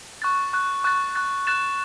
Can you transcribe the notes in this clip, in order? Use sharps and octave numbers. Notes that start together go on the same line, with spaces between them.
C#6 F#6 A6
C#6 F#6 A6
C#6 F#6 A6
C#6 F#6 A6
F#6 A6 E7